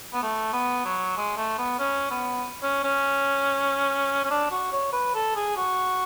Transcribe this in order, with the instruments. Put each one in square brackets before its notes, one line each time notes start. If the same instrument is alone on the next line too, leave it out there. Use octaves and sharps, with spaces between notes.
[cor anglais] B3
A3
B3
F#3
G#3
A3
B3
C#4
B3
C#4
C#4
C#4
D4
F#4
C#5
B4
A4
G#4
F#4